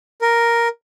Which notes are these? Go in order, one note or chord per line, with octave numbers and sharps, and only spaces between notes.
A#4